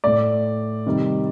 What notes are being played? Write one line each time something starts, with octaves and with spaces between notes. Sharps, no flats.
A2 A3 D5
C3 D#3 G3